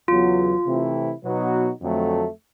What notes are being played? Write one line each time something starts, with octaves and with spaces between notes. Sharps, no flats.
E2 C#3 F#3 B3 F4
C3 E3 A3 C4 E4
B2 F#3 B3 D#4 F#4
F2 D3 F#3 A3